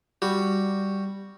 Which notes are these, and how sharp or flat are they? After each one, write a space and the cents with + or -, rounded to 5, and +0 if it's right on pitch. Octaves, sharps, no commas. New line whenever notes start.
G3 +0 F#4 +0